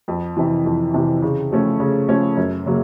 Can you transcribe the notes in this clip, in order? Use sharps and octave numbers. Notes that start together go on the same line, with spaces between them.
F2
C3 E3
F2
C3 E3
C#3
F3 A3 C#4
C#3
F3 A3 C#4
F#2
C#3 F#3 A#3